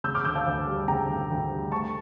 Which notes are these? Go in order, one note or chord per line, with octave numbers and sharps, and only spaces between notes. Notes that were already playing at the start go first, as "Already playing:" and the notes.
C#3 E6 G6
D6 F6
D2 E6 G6
F5 A5
D2
G3
C#3 G5 A#5
D2
D2
G3
A3 A5 C#6